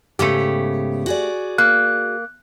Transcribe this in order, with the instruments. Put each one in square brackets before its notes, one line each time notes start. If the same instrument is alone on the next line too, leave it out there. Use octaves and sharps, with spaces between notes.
[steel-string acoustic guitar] G#2 C#3 B3 [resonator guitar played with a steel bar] A3 G4
[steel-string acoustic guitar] F#4 G#4 D5
[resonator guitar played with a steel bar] A#3 [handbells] F#6